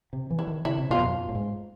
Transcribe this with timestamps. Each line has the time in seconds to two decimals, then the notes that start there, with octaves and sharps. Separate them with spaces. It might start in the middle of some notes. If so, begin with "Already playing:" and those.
0.13 C3
0.31 E3
0.39 E4
0.47 D#3
0.65 C#3 E4
0.78 C3
0.90 B2 F4
0.98 F2
1.05 F#2
1.29 A2
1.35 G#2